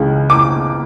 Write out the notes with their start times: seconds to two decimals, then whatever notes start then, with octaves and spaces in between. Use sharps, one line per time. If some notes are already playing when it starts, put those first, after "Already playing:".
Already playing: C#2 C#3 E3 G#3
0.30 D6